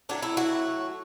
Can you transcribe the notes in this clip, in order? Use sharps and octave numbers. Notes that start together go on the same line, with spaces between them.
A2 F#3 A3 D4
E4
F#4